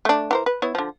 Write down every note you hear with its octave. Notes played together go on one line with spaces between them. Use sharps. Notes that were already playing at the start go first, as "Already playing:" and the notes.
A3 D4
E3 A#4 C5
B4
B3 E4 C#5
D3 F3